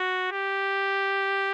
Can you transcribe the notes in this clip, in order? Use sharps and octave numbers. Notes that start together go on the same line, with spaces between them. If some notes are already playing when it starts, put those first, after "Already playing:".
Already playing: F#4
G4